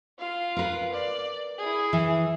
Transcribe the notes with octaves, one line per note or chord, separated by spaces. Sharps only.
F4 F5
A#4 B4
D5
E4 G#4
E3